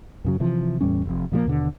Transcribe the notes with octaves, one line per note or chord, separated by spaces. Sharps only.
F#2 C#3 F#3
C3 E3 F3
E2 A2 G3 C#4
F1 F2
A#2 F3 F#3 A#3
D#2 B2 D3